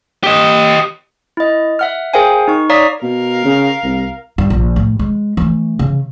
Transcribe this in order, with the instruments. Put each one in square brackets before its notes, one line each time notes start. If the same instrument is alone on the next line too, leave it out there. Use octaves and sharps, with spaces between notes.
[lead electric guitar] G4 D#5
[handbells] E4 D#5
E5 F#5 F6
G#4 A#4 C5 F5 G5 G#5
D#4 C#6
C#5 D5 F5 A#5 D#6 B6
[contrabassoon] B2 [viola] A#4 F5
[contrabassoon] C#3
C2
[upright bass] G2
A#1
A2
G#3
E3 A3
C#3